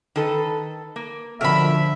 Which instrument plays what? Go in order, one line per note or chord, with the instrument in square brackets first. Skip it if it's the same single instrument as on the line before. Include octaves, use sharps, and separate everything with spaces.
[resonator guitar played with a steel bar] D#3 A4 B4
A#3
[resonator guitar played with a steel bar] B2 [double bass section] D3 F3 [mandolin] A#4 B5 [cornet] E5